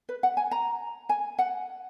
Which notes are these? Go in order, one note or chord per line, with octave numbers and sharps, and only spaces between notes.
B4
F#5
G#5
A#5
G#5
F#5